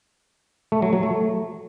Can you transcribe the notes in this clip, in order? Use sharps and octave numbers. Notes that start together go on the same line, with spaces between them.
A3
F#3
F#3
A3